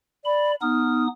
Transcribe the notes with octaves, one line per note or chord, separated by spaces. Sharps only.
D5 B5
B3 D#4 D#6 F6